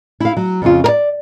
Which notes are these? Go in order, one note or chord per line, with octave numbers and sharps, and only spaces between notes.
E4 F5
F#3
F2 C#3 F4
A#4 D5